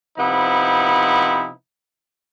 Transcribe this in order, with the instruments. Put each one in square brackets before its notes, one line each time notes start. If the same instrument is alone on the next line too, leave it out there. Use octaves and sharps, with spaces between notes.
[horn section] C3 F3 B3 D#4 E4